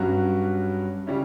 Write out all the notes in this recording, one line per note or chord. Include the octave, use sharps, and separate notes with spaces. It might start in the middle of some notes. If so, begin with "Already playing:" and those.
Already playing: G2 F#3 C#4 F#4
C#3 G3 C#4 E4